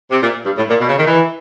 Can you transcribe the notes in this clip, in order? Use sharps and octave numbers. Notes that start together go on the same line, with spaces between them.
C3
A#2
G2
A2
A#2
B2
C#3
D#3
E3